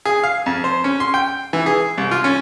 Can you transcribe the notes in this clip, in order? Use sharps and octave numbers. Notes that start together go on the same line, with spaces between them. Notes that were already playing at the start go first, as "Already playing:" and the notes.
G#4
F5
F2
C5
C#4
C6
G5
E3
G#4
C2
F4
C#4